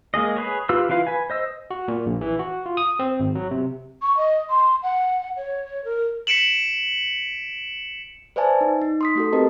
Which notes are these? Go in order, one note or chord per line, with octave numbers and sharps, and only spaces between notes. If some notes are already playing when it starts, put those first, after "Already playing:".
G#3 A#3 G#4 D#5
G#4 B4 C#5
F4 G4 B4 E6
E3 E4 F4 B4 F5
B4 G#5
C5 D#5 E6
F#4
A#2
A#1
E3
F#4
F4
D#6
C4
G#1
F#3
C3
C#6
D#5
C6
F#5
C#5
A#4
B6 C#7 D7 E7 F#7
B4 C5 D5 E5 G#5 A5
D#4
D#4
C6 D#6 B6
A3 F#4 A4
C4 G4 A#4 B4 D#5 A5